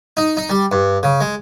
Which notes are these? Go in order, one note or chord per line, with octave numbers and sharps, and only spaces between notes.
D#4
D#4
G3
G2
C#3
G#3